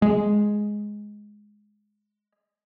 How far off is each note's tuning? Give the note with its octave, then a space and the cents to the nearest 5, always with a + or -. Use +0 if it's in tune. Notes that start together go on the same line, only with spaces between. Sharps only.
G#3 +5